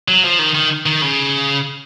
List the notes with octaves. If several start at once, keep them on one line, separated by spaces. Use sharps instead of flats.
F#3
F3
D#3
D#3
D#3
C#3